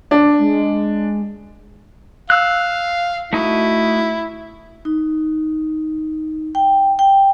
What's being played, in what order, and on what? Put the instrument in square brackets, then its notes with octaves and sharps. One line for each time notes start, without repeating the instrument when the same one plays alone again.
[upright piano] D4
[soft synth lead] G#3
[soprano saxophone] F5 [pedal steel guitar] E6 F#6
[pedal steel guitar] A3 D#4 F#4 [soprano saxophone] E4
[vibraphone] D#4
G5
G5